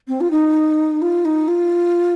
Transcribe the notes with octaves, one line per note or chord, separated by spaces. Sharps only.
C4
F4
D#4
F4
D#4
F4